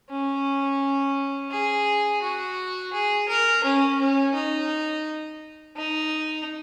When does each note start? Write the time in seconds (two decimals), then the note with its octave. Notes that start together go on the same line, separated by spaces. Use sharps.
0.10 C#4
1.51 G#4
2.22 F#4
2.93 G#4
3.28 A#4
3.64 C#4
3.99 C#4
4.34 D#4
5.76 D#4